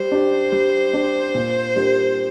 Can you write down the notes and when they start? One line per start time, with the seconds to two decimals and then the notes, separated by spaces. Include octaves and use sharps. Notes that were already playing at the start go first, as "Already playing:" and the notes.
Already playing: G3 C5
0.12 D4 G4
0.52 G3
0.94 D4 G4
1.35 A#2
1.76 G3 D4 G4 A#4